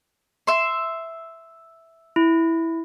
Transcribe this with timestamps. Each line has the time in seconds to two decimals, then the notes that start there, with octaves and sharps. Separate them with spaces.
0.47 E5 C6
2.16 E4